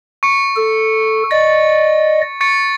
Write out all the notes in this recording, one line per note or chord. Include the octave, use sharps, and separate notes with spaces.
C#6 C#7
A4
D5 D#5 A6
C#6 A6 C#7